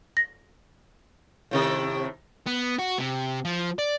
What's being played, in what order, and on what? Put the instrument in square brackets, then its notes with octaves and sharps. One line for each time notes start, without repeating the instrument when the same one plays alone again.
[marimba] A#6
[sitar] A2 C3 D#3
[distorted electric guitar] B3
F#4
C3
F3
D5